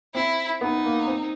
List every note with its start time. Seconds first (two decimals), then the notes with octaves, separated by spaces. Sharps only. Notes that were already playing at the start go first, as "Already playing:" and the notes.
0.15 C4 E4
0.61 B3 D#4
0.84 A#3
1.07 C4